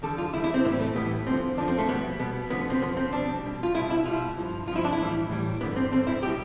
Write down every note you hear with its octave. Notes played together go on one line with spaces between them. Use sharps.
E2 D3 G3 A4
F4
E2 D3 G3 E4
E4
C4
A2 E3 G3 B3
A3
A2 E3 G3 B3
F2 D3 F3 C4
F2 D3 F3 D4
C4
A3
B2 G3 B3
B2 G3 B3
F2 D3 F3 B3
C4
F2 D3 F3 B3
C4
B2 G3 D4
B2 G3
F4
B2 G3 E4
E4
B2 G3 F4
G2 F3
G2 F3 E4 F4
D4
E4
A2 E3 G3
A2 E3 G3
G2 D3 G3 B3
C4
G2 D3 G3 C4
E4
B2 G3 G4